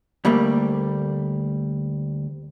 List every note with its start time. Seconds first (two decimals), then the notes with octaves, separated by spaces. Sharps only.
0.25 D2 G3 A3 A#3